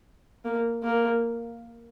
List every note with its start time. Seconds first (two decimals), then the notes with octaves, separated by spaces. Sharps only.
0.44 A#3
0.83 A#3